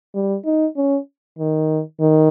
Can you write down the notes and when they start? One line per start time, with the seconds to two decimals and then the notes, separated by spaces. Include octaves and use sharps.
0.15 G3
0.45 D#4
0.76 C#4
1.39 D#3
2.00 D#3